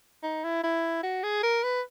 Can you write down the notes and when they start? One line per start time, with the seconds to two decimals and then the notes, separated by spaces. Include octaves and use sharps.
0.23 D#4
0.44 E4
0.63 E4
1.03 F#4
1.23 G#4
1.43 A#4
1.63 B4